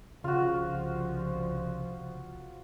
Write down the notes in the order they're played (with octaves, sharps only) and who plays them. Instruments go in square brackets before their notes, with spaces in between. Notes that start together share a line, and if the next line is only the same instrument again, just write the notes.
[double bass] C2 F3 [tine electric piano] C#3 [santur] F4 F#4